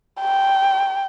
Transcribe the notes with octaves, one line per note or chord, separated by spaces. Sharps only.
G5